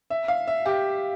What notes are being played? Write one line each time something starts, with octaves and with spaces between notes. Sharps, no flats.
E5
F5
E5
G4